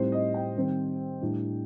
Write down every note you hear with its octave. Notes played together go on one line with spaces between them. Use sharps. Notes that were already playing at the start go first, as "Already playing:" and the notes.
Already playing: A2 G3 C4 D#4 C5
D#5
G5
D#3 G3 C4
A2 G3 D4